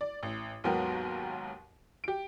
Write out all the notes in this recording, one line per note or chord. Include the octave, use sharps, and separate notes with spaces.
D5
A1
D#2 G#2 F#3 B3 A#4 G5
G4 D7